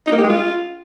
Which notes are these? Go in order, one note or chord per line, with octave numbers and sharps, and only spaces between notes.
D#4
A#3
G4
G#3
F4